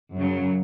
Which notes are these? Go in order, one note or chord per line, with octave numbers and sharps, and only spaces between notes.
F#2 C#3 F#3